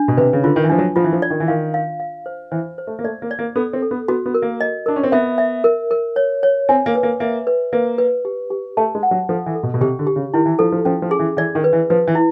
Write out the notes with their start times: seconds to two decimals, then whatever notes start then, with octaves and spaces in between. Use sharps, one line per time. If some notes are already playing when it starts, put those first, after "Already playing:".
Already playing: D4
0.08 B2
0.17 C3 B4
0.33 C#3
0.44 D3 F4
0.56 D#3
0.64 E3
0.69 F3 D4
0.79 F#3
0.96 F3 F4
1.04 E3
1.13 F3
1.22 D5
1.30 D#3
1.40 E3
1.48 D#3 F5
1.74 F5
2.00 F5
2.26 C5
2.52 E3 C5
2.78 C5
2.87 A3
2.99 A#3
3.04 A3 D5
3.22 A#3
3.31 D5
3.39 A#3
3.56 B3 A4
3.73 C4
3.82 A4
3.91 B3
4.08 B3 F#4
4.26 B3
4.34 A#4
4.42 A#3
4.61 D#5
4.86 D4 A#4
4.96 C#4
5.04 C4
5.12 B3 E5
5.38 E5
5.64 A#4
5.91 A#4
6.16 C#5
6.43 C#5
6.69 C4 G#5
6.86 A#3
6.95 B4
7.03 A#3
7.20 A#3 E5
7.47 B4
7.73 A#3 B4
7.98 B4
8.25 G4
8.50 G4
8.77 A3 A5
8.95 G#3
9.03 F#5
9.11 F#3
9.29 F3 A4
9.46 E3
9.55 A4
9.63 B2
9.74 B2
9.81 C3 G4
9.99 D3
10.07 G4
10.16 C#3
10.34 D#3 E4
10.46 E3
10.59 F3 A4
10.72 F3
10.85 F3 C#4
11.02 F3
11.11 G#4
11.20 E3
11.37 E3 D5
11.55 D#3
11.64 B4
11.73 E3
11.90 F3 B4
12.08 E3
12.15 E4